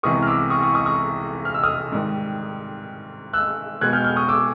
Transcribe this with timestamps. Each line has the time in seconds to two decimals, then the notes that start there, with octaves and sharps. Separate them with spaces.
0.03 C2 C3 E3 G#3 B3 C#6 D#6
0.22 F6
0.27 D6 E6
0.50 C#6 D#6
0.62 C#6 D#6
0.74 C#6 D#6
0.86 C#6 D#6
1.45 F6
1.54 E6
1.63 D#6 F6
1.92 G#2 D#3 G3
3.33 E6 F#6
3.81 B2 G#3 B3 F#6 G#6
3.93 F6 G6
4.04 F6 G6
4.16 C#6 D#6
4.29 D6 E6